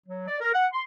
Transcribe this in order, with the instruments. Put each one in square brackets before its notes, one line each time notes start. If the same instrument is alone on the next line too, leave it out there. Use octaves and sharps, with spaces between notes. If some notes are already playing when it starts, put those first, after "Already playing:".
[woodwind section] F#3
D5
A#4
F#5
C6